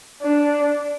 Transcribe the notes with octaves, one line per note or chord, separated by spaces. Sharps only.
D4